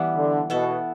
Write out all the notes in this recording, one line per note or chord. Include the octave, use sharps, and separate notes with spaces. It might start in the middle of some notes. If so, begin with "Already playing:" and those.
Already playing: E3 G3 B3
D3
B2 B3 E4 A4